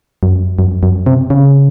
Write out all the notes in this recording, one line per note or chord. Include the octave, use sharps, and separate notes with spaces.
F#2
F#2
F#2
C3
C#3